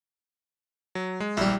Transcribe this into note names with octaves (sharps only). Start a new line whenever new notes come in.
F#3
G#3
A#1 G3 E4